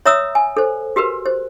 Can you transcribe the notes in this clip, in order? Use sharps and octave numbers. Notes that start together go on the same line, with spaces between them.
C#5 E5 A#5 D#6 E6
G#5
A4 C5
F#4 G4 A#4 B4
C5